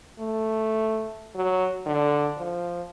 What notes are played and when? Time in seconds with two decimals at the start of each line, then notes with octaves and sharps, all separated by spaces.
0.19 A3
1.35 F#3
1.86 D3
2.38 F3